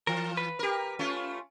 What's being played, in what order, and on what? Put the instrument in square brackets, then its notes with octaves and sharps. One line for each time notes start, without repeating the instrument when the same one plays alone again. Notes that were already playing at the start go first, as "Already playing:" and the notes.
[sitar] E3 [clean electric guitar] A#4
[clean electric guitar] B4
[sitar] G4 A#4
A3 C#4 F4